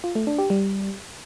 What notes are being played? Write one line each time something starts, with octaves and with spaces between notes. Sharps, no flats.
F4
A3
D4
G4
G3